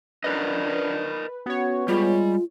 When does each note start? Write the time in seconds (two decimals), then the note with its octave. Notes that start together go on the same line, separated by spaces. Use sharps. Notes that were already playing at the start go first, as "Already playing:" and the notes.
0.24 F3 C#4 D4 A#4 B4 D5 D#5
1.46 B3 C#4 F#4 C#5
1.88 G3 G#3 F4